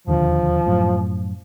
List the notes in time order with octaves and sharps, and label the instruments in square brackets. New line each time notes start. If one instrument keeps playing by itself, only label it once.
[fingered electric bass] E1 D#2 D3 [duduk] F3
[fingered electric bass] F#2 A2